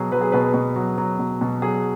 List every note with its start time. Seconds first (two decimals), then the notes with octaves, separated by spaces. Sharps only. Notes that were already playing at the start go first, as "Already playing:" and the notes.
Already playing: B2 F#3 G#4
0.11 F#3 B4
0.21 G#4
0.32 B2 B4
0.54 B2
0.76 F#3
0.98 F#3
1.19 B2
1.41 B2
1.62 F#3 G#4